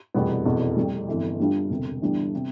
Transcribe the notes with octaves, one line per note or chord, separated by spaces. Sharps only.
F1 E2 B2 G3 B3
F1 E2 B2 B3
F1 F2 C3 G3
G1 F2 E3
G2 D3 G3 D4 F4
E1 D2 C3
G1 G2 E3 G3 D4
C3